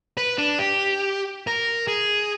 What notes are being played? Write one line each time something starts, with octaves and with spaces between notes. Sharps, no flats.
B4
D4
G4
A#4
G#4